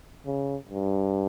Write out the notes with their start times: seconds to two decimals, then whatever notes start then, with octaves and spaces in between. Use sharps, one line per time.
0.26 C#3
0.69 G2